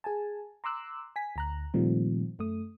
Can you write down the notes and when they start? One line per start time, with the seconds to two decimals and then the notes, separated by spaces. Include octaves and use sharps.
0.04 G#4 G#5 A5
0.64 A#5 C6 D6 E6 F#6
1.16 G#5 B6
1.36 D2 A#5 F#6
1.74 A#2 D#3 F3 G3 A3 C4
2.39 F#2 A3 D#6